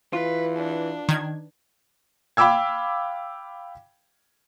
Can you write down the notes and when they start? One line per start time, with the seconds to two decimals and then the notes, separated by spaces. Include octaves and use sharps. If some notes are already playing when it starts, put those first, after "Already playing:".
0.13 E3 F4 B4
0.57 D4
1.09 D#3 G#6
2.37 F5 G5 B5 D6 E6 G#6